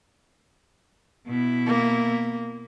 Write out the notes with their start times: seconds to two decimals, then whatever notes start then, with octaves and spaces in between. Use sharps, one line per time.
1.27 B2 E4
1.67 A#3